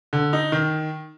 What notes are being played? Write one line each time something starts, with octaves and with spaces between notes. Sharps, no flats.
D3
D#4
D#3